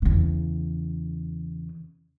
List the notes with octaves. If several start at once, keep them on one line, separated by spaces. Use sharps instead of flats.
E2 C#3